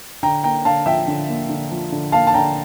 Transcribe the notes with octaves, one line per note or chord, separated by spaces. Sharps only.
D3 G5 A#5
A#3 G5 A#5
D3 F5 A5
F3 E5 G5
D3
A#3
D3
F3
D3
A#3 F5 A5
A5
D3 G5 A#5